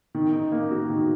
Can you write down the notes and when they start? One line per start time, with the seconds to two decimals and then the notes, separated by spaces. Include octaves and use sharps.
0.15 D#3
0.33 D#4
0.52 A#3
0.71 F#4
0.90 D#3